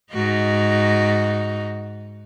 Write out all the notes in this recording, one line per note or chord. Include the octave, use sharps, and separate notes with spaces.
G#2 D#4 F#4